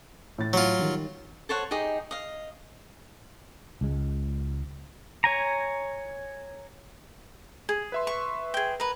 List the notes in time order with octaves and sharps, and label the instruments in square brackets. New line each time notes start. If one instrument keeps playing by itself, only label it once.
[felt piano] A2 A6
[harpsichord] F#3 F4
[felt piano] D#3 G3
[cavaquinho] A4 C5 C#5 F#5
D#4 G4 G#4 D#5
D#5 F5
[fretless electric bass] C#2 G#3
[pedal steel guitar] C#5 G#5 A#5
[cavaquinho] G#4
[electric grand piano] B4 E5 C6
[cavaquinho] C#6
G#4 G5
A#4 B4